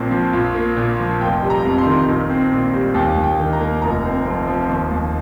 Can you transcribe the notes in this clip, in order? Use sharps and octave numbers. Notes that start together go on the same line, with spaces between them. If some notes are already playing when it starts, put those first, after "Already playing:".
Already playing: A#1 A#2 C4
F3
A#1
A#3
A#2
F3
F1 G5
G3
A#5
F2
C6
D#3
A#1
C4
A#2
G3
D#2 G5
D#2
G5
D#3
A#5
A#3
F1 A#5
C4
F2
F3
D#2
D#2